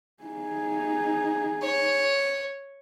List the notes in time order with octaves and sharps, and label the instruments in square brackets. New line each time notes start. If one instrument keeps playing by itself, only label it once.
[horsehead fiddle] D#4 G#4
[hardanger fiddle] C#5